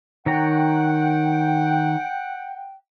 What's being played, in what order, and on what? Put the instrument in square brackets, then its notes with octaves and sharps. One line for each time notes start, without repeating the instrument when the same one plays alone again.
[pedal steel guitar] D#3 C#5 A#5 [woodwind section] F#5 G5